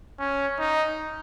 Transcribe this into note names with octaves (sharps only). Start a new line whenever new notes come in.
C#4
D#4